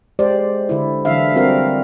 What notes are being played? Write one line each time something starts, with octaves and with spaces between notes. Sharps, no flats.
G#3 G4 C5 D5
D3 E4
D3 E3 F#3 D4 E5 F5
G3 C4 F#4 A#4 F5